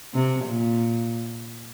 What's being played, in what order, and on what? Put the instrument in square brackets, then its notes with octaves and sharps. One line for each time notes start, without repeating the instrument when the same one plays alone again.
[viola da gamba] C3
A#2